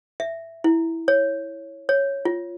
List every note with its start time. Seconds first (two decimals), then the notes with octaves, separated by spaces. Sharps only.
0.20 E5
0.64 E4
1.08 C#5
1.89 C#5
2.25 F4